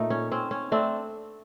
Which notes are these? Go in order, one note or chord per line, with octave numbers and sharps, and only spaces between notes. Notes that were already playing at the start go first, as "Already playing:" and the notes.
Already playing: A#2 A3 D#4
C#4
C4 C#4
C#4
A3 C4 D4